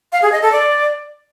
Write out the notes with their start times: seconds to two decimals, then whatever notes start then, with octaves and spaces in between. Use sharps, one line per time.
0.12 F5
0.22 G#4
0.32 D#5
0.42 A4
0.52 D5